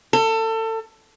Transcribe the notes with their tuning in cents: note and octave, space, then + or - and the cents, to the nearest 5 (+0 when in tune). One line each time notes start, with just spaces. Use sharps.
A4 +25